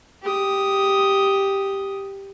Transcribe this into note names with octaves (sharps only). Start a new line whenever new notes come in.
G4 D#6